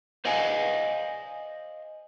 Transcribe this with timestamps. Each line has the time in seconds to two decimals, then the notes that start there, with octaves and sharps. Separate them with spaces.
0.25 C5 D5 D#5 F5 G#5